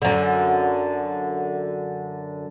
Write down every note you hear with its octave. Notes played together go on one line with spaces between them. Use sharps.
F#2 D3